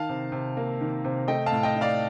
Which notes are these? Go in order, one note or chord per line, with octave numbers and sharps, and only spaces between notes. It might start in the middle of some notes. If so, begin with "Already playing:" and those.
Already playing: D#3 F5 A5
C3
C3
A#3
D#3
C3
A3 D#5 G5
F5 A5
A2
D#5 G5
D#4
D5 F5